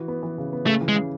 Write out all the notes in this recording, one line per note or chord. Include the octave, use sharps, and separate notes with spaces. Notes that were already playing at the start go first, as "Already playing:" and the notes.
Already playing: E3 F#4
B3
E3
C#3
B3
C#3 A3
E3
G#3
C#3